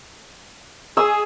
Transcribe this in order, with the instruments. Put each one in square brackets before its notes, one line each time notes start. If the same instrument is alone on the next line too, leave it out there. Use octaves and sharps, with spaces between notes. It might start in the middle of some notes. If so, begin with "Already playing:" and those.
[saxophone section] G#4 [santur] E6